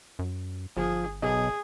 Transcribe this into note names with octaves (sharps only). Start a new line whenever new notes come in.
F#2
G1 F3 G#4
B1 G#4 D#5